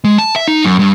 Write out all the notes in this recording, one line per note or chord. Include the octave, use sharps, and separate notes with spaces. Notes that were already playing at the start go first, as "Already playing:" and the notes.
G#3
A5
E5
D#4
F#2
G2